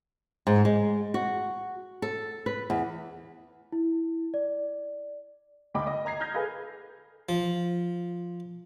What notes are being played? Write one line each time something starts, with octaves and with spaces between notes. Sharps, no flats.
G#2
G#3
F#4
A4
B4
E2
E4
D5
D2 D#5 G5 B5 D6
D#5
D#5 A#5 G#6 C7
A#5 D#6 F6 G6 G#6 A#6
G#4 A4 B4 F5 B5 G#6
F3